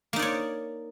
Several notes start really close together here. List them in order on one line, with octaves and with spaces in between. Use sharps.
A#3 D#4 D5 C#5